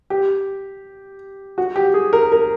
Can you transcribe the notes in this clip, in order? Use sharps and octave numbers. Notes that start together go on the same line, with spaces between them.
G4
F#4
G4
G#4
A#4
A#4